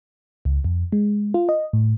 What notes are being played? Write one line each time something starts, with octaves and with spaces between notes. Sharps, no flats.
C#2
F2
G#3
F4
D#5
A2